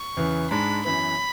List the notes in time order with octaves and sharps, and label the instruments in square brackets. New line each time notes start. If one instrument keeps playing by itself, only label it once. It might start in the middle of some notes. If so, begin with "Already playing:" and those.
Already playing: [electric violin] C#6
[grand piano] E2 C#3 E3
[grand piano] G#2 G#3 D4 [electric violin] B5
[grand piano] F#2 E3 B3 [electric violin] B5